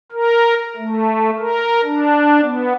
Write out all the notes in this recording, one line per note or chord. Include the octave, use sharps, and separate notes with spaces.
A#4
A3
A#4
D4
B3